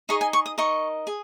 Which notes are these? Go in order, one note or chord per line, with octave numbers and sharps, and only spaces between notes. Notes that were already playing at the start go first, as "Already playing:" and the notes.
D#4 G#4 D#5 C#6
G#5
C#6
D#6
D#4 A#4 D#5 C#6
G#4